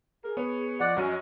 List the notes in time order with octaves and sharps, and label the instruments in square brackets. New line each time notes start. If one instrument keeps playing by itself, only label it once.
[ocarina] G#4 [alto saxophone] A#4
[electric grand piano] B3 [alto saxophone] C#5
[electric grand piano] F3 [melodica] D5 F#5 [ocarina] D#5
[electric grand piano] F#2 F#3 D#7 [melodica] C#4